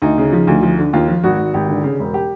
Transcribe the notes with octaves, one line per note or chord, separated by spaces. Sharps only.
D2 D#4
C#3
F3
D2
F3
D3
D#2 F4
F3
G#1 F#4
G#1
G#1 G4
D3
C#3
E1
G4